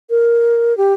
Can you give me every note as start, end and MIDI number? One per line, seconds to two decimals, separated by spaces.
0.10 0.76 70
0.77 0.94 67